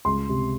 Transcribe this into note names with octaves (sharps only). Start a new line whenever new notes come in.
C#2 C6
C3